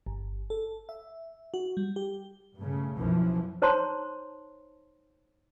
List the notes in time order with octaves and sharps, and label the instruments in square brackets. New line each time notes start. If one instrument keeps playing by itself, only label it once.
[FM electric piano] G1
A4
E5
F#4
G3
G4
[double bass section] G2 C#3 A3
B1 F#2 E3 F3
[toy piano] D#4 C5 C#5 A5 A#5 C6